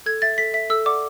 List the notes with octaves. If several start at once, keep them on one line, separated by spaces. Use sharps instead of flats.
A4 G#6
E5 A6
A4 B6
E5 B6
A4 E6
D5 F#5 D6